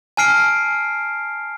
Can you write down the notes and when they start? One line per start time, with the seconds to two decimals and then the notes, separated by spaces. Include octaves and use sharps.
0.17 G#5 A5 F6 C7 D7